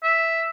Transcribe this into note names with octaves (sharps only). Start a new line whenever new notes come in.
E5